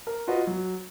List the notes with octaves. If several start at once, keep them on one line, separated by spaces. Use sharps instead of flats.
A#4
F4 F#4 B4 D#5
F#3